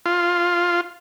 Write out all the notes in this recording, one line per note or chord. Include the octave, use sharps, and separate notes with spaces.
F4